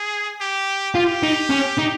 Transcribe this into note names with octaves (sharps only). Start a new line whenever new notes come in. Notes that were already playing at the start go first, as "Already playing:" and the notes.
Already playing: G#4
G4
F4 G4
D#4
C#4
D#4